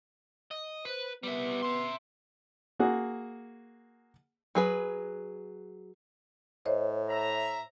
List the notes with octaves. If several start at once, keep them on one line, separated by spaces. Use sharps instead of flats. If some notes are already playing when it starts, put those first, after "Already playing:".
D#5
B4 C5
G3 B3 E5
E5 C6
A#3 F#4 G#4
F#3 G#4 B4
A2 C5 C#5 D#5
E5 A#5